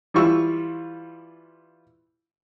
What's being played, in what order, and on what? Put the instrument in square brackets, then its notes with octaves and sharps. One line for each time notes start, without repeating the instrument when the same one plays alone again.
[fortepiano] E3 G3 F4 C#6 E6